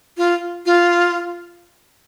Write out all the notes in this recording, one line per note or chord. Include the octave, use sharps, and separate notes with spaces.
F4
F4